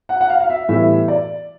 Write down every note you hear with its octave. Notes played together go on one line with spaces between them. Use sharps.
F#5
F#5
F5
F5
E5
A2 E3 G3 B3 E5
D5